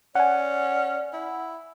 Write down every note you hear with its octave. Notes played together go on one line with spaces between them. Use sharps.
C#4 D5 F#5 G#5
E4